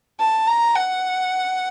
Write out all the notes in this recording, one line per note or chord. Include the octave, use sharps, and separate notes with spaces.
A5
A#5
F#5